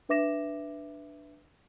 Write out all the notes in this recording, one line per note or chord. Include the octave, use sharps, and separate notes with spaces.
D4 B4 E5 D6 A#6 E7